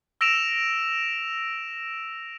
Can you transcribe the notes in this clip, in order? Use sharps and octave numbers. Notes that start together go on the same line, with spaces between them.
E6 A#6 D7 E7 F7